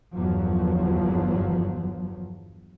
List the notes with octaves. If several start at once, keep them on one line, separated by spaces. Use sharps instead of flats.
G1 E2 F3 F#3